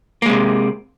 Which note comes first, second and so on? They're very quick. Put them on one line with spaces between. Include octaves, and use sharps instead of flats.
A#3 G#3 C3